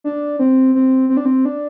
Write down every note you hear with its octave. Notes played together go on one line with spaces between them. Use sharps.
D4
C4
C4
C4
D4
C4
D4